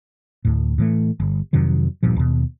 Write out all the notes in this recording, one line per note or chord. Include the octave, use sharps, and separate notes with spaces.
D2 A2
A2 E3 A3
G1
F2 C3 D#3 F#3
D1 G2 A#2 F3
D#2 B2